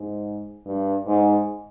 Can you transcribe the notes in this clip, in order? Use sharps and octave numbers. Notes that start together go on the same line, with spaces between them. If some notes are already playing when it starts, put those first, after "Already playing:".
Already playing: G#2
G2
G#2